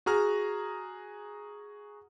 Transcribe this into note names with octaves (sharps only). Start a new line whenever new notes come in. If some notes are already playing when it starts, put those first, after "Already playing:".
F#4 G#4 A#5 F6